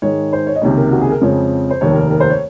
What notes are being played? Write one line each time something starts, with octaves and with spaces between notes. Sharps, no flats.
G#2 D#3 G#3 C#5
C5
C#5
D#5
C#2 C3 D#3 A#3 C#4 C#5
A#4
F#4
G#4
A#4
F2 C#3 F3 G#3 C4 C#5
C5
F1 D#2 D#3 C#5
A#4
A#4
C5
C#5